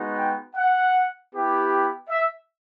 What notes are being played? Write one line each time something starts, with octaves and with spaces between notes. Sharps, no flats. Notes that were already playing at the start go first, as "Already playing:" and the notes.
Already playing: G#3 B3 D#4 F#4
G5
F#5
B3 E4 G4
E5